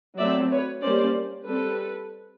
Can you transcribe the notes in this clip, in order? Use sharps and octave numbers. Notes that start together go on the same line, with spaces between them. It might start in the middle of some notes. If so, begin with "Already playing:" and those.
F#3 A3 C4 D5 E5
B4 C#5
G3 A#3 C#4 C5 D5
G3 C4 A4 B4